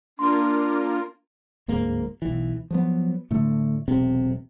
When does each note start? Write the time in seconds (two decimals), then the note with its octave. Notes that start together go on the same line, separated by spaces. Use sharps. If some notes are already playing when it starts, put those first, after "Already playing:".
0.19 A#3 D4 F4 A#4 C6
1.68 D1 G#2 A#3
2.22 B1 E3
2.71 F3 F#3 B3
3.31 A2 D3 A3
3.88 E1 B1 C3 C4